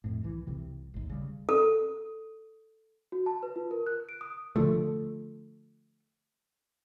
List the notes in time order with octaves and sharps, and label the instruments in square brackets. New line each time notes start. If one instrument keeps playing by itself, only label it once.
[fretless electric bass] F2 A2
C2 E3
C2 C3 E3
G#1 D#2
C#3 G3
[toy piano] A4
[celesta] F#4
A5
B4
F4
A#4
F#6
D7
D#6
[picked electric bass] D3 F3 A3